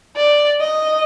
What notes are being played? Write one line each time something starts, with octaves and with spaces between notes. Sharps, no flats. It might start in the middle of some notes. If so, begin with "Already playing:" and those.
D5
D#5